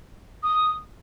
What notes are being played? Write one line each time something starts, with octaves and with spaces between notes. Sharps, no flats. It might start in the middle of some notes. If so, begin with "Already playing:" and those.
D#6